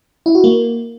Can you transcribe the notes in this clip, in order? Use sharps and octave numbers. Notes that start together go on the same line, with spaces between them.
E4
F#4
A#3